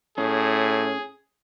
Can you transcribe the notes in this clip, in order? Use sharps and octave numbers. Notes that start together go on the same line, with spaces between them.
A2 C#4 G#4